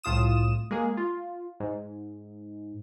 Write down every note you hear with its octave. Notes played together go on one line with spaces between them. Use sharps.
C2 A2 F4 D#6 E7
G#3 A#3 G#4
F4
G#2